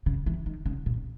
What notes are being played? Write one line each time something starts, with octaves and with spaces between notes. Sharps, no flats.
C#3
E3
D#3
C#3
A#2